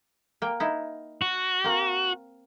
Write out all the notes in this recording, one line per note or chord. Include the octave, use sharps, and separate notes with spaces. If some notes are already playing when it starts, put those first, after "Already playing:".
A#3 G5
D#4 E4
F#4
A#3 C4